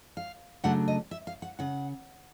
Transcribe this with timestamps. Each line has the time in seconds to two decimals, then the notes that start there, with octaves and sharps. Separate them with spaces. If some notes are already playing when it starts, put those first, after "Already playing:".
0.17 F5
0.64 C#3 F#3 A3 D4 F#5
0.88 D#5
1.11 E5
1.27 F5
1.42 F#5
1.59 C#3 F#5